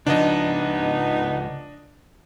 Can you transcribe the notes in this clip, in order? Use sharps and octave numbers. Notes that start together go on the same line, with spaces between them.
C#2 F3 B3 D4 D#4 D#5